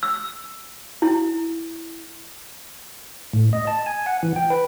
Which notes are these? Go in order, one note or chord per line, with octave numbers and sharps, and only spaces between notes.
E6
E4
A2
D#5
A5
G#5
F#5
E3
G5
B4